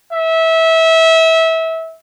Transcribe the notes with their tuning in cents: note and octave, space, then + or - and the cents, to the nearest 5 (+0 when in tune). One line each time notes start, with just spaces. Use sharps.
E5 -25